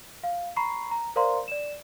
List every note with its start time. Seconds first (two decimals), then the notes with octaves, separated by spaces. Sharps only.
0.24 F5
0.56 A#5 B5 C#6 C7
0.91 A#5
1.16 A#4 C5 D5 F5 A#5 C6
1.48 D5 E7